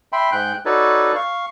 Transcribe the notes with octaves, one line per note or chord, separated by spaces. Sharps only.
E5 G5 B5 C6
G#2 G5 F#6 G6
D#4 F#4 A4 B4 C#5 D5
F5 C#6